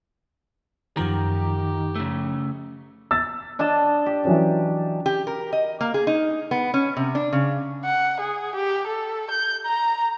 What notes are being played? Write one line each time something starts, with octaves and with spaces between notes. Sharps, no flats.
F#2 D#3 F3 G4 A#5
C#3 A3
E6 A6
D4 D#5 A5
G4
E3 F#3 C#4
G4
A#4
D#5
A#3
G#4
D#4
B3
C#4
C3
D4
C#3
F#5
G#4
G4
A4
G6
A#5